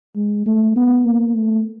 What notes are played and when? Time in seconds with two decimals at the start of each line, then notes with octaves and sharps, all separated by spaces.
0.16 G#3
0.46 A3
0.76 B3
1.06 A#3
1.35 A3